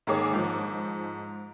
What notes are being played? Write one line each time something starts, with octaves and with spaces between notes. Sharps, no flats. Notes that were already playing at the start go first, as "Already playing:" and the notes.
G#2 D#3 A#3 G#4 C#5 D6
G#2 F3